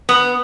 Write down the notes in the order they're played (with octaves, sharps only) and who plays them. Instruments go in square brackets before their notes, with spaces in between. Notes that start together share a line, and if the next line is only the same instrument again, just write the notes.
[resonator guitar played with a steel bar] B3